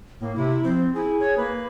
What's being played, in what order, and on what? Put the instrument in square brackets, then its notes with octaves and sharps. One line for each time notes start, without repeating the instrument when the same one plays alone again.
[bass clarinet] A2 [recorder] A#3
[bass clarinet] C3 [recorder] E4
[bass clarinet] F3 [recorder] C4
[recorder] E4 [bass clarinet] G#4
[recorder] C#5
[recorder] A#3 [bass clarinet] B4